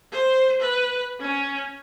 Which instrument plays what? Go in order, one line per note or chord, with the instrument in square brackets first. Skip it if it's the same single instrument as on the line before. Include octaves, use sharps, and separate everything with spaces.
[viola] C5
B4
C#4